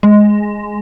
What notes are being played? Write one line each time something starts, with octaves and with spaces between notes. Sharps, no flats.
G#3